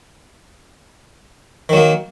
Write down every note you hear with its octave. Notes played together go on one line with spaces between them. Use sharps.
D#3 F#3 A#3